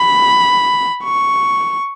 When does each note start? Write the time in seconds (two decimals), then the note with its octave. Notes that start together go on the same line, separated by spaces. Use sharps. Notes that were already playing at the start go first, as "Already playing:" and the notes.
Already playing: B5
1.05 C#6